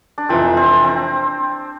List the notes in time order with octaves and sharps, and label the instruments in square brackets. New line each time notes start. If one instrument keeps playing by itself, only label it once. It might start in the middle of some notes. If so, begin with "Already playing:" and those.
[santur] D4
[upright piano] F1 F2 E3 [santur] C4
[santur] C4
C4